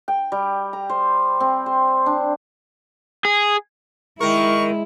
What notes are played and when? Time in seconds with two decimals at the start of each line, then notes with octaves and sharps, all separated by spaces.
0.08 G5
0.32 G3
0.73 A#5
0.89 C5
1.40 C4
1.66 C5
2.06 D4
3.25 G#4
4.21 D#3 G#3 E4 A#4 C#6